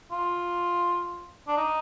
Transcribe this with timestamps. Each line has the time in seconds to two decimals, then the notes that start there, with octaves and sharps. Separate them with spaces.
0.12 F4
1.48 D4
1.57 D#4